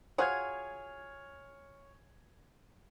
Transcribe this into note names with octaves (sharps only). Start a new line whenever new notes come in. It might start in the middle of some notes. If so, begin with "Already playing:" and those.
F4 F#4 G#4 C#5 F6 G#6